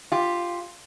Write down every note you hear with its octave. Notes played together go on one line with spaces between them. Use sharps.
F4 G4